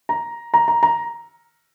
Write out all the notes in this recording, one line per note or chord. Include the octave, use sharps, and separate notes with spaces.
A#5
A#5
A#5
A#5